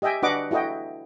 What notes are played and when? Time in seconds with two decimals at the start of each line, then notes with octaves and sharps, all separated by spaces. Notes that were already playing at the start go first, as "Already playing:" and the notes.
0.02 G4 D#5 E5 G5 G#5
0.23 D4 F#4 B4 D#5 F#5 D6
0.51 E4 F#4 A4 D#5 G5